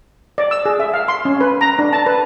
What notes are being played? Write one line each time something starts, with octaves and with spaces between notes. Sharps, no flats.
D5
E6
G#4
E5
F5
C6
C#4
B4
A#5
D4
A5
B4